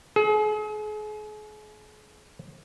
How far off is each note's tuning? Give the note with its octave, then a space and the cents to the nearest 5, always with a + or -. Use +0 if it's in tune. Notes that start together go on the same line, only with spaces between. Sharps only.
G#4 +40